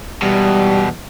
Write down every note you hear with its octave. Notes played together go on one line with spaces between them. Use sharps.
E2 B2 G3